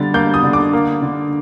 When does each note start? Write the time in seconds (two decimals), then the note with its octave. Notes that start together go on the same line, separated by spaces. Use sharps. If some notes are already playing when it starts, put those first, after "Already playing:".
Already playing: D3 G3 A6
0.14 A#3 G6
0.34 D#6
0.43 D3
0.53 D6
0.73 A#3
1.02 D3